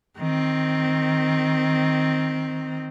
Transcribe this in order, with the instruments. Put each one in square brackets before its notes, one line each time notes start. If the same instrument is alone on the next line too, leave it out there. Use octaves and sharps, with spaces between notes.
[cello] D#3 C4